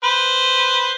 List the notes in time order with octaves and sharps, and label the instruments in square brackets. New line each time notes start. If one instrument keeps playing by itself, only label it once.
[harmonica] B4 C5